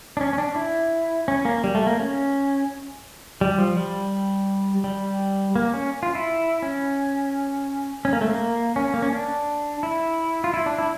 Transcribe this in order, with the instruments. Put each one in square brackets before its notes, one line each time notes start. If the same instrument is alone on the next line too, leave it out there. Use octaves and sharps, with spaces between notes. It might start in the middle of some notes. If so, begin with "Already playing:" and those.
[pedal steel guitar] D4
C#4
C#4
D4
E4
C#4
A#3
G3
A3
A#3
C#4
G3
F3
G3
G3
A#3
C#4
F4
E4
C#4
C#4
A#3
A3
A#3
C#4
A#3
C#4
D4
E4
F4
E4
D4
E4